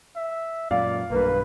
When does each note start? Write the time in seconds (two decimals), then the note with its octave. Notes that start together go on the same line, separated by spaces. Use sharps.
0.16 E5
0.71 F#2 A#2 D5 F5
1.11 B1 G2 A#3 B4